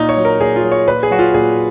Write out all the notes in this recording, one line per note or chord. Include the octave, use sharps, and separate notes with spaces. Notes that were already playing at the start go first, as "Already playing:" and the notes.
Already playing: A#2 D#4
C#5
F#3
A#4
A#2 G#4
F4
F#3
C#5
A#2 B4
G#4
F#3 F#4
F4
A#2 G#4